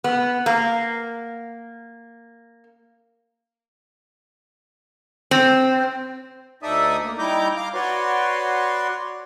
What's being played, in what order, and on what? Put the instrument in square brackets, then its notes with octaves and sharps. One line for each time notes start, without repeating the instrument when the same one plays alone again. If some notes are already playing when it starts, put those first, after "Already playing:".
[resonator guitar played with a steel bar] B3
A#3
C4
[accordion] D2 D#4 A4 D5 E5 D#6
A#3
G3 D#4 E4 A#5 D6 G6
F5 A#5 D6
F#4 B4 C#5 D5 C6